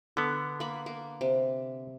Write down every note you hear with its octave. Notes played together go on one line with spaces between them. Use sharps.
D3 B3 A4
A#3 B5
A#3
C3